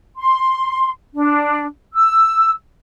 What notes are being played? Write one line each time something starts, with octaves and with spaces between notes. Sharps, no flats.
C6
D4
E6